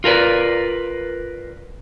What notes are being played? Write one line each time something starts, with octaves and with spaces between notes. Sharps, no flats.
F4 A#4 B4 D5